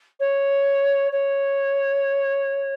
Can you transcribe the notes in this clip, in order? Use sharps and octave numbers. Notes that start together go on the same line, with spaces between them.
C#5
C#5